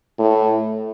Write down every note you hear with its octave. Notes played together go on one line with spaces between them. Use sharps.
A2